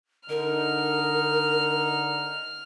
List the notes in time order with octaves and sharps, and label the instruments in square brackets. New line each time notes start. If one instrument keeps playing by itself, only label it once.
[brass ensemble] D3 D#4 [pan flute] A#4 [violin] F6